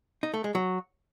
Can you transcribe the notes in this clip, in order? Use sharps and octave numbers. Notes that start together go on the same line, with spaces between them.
D#4
A3
G#3
F#3